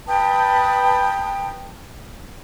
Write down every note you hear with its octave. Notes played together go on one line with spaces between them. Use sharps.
B4 G5 A5 D#6